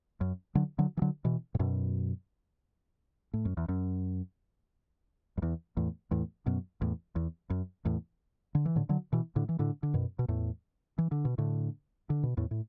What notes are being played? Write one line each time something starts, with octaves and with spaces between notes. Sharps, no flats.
F#2
D3 F#3
D3 F#3
E3
D3 F#3
B2 E3
A2
F#2 B2
A2
F#2
E2
F#2
F#2
E2
E2 A2
E2 A2
F#2 B2
E2 A2
E2
F#2
E2 A2
D3
E3
A2 D3
D3 F#3
B2 E3
A2 D3
E3
A2 D3
D3
F#2 B2
B2
E2 A2
E3
D3
B2
A2 D3
D3
B2
E2 A2
A2